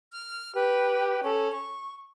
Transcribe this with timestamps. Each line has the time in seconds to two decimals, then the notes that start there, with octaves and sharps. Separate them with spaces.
0.11 F6
0.54 G4 B4
1.23 C#4 A4
1.51 C#6